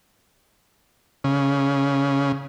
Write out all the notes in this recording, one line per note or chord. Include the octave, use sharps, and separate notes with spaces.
C#3